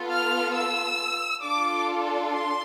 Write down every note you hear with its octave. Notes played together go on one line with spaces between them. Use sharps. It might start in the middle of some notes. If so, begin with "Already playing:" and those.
Already playing: B3 F4 A4
F6
E6
D4 F4 A4 D6
C6